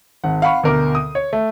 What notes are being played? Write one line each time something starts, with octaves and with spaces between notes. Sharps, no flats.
G#1 F#5
F5 F#5 B5 C#6
D2 B2 A#4 D6
D#6
C#5
A3